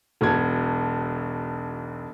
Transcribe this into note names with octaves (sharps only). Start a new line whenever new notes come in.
E1 B1 G#6